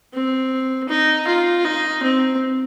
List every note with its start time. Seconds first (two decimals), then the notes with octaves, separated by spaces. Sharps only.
0.14 C4
0.89 D#4
1.27 F4
1.65 D#4
2.03 C4